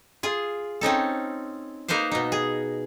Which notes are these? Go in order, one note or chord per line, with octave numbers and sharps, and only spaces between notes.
F4 G#4
C4 C#4 D#4 A4
A#3 D#4 B4 C5 F5
B2 D#4
G#4